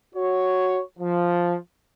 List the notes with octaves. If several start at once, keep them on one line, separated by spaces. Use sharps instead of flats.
F#4 C#5
F3